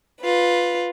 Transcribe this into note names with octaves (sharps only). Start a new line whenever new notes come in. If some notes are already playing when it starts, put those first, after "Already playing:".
F4 B4